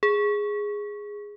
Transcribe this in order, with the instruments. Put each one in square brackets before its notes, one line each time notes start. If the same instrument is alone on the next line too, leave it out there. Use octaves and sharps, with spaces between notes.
[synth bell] G#4